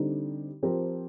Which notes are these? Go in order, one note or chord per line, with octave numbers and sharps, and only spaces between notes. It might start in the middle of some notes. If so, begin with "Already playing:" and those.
Already playing: D3 G3 C4 D#4
F3 C4 G4 A#4